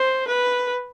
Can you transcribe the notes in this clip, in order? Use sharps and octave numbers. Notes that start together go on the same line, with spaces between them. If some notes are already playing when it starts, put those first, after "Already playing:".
Already playing: C5
B4